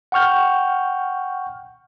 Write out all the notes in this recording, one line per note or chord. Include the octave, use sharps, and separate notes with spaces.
F#5 G5 C#6 F6 G6